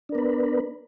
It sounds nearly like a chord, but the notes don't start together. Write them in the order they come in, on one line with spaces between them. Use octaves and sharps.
D4 A#4 B3 B4